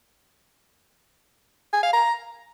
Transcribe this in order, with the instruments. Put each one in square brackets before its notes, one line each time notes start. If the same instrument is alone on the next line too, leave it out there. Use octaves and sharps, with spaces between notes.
[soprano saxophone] G#5
F5
A#5